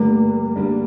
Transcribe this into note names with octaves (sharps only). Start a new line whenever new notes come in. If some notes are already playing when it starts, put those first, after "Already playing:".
Already playing: G2 D3 G3 A3 A#3 D4
G2 D3 G3 A#3 D4